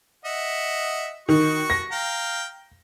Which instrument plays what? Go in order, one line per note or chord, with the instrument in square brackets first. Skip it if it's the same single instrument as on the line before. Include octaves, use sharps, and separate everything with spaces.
[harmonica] D#5 E5 F#5
[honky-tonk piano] D#3 [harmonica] F#4 C#6
[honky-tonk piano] A#6
[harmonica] F5 G5 A#5